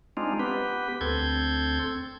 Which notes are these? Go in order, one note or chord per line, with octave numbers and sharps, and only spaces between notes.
G#3 C4 D4 D#4 F4
B3 G4 B4
D2 C4 A4 G6 G#6